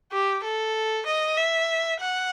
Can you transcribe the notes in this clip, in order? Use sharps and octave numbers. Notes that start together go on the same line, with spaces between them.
G4
A4
D#5
E5
F#5